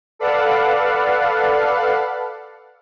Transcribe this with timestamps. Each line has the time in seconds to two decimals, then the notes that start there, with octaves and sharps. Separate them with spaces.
0.19 A4 B4 D5 F5 F#5 A5